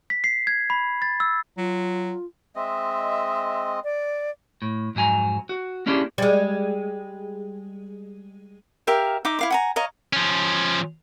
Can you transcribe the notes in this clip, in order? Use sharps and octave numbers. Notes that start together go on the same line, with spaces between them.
B6
C7
G#6
B5
A6
E6
F#3 F4
G#3 C4 D#5 E5
D5
A2
F2 G#2 F#3 G#5 A#5
F#4
A#3 C#4 D4 E4 G4 G#4
G3 G#3
G4 A#4 E5 F5
D#4 E5 D6
E4 F5 D6
F#5 G#5 A#5
C#5 D#5 F5 A#5
F3 C#4